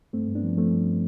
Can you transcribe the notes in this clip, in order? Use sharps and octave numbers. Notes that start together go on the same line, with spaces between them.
G2 A3 C4
G2
B3 D4
F3
F3 A3 C4
G2